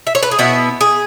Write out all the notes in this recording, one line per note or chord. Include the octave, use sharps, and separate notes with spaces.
E5
C#5
B4
G#4
B2 B3 E4 F#4
G#4